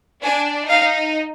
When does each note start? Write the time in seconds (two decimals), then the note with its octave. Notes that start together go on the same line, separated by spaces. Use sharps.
0.24 D4 G#5
0.69 D#4 F5